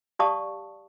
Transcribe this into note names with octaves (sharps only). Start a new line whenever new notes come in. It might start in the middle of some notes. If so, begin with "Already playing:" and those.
G4 D5 F5 A5 C#6 D#6